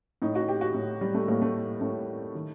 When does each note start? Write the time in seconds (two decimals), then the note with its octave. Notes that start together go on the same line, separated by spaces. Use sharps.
0.22 A2 D#4
0.35 F#4
0.48 G4
0.61 F#4
0.74 A2
1.01 G3
1.15 A3
1.28 A2 A#3
1.42 A3
1.81 A2 A3
2.35 D#3